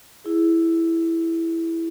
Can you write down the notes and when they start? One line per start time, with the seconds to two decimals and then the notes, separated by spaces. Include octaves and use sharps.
0.24 E4 G#4